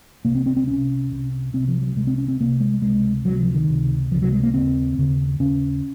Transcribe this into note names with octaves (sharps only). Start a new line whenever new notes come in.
C2 C3 A#3
C4
C4
C4
C2 C3 C#4
C2 C3
C2 C3 C4
F3
F#3
C2 C3 G#3
C4
C#4
C4
C2 C3 A#3
G#3
C#2 C3 G#3
C#2 C3 F#3
F3
D#3
C#2 C3
C#2 C3 F3
F#3
G#3
A#3
D#2 C#3 C4
D#2 C#3
D#2 C#3 C#4